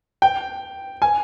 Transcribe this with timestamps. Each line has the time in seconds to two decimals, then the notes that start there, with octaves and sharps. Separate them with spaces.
0.22 G5
1.02 G#5